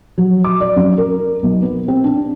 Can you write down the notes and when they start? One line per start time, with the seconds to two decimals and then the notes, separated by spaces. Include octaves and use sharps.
0.18 F#3
0.44 D6
0.60 D5
0.76 F#2
0.98 A#4
1.43 B1
1.62 B3
1.88 C4
2.04 D4